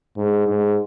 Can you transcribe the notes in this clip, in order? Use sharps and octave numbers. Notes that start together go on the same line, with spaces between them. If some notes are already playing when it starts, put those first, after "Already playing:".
G#2
G#2